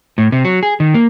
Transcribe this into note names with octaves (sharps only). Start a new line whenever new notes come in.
A2
C3
F#3
G#4
D#3
A#3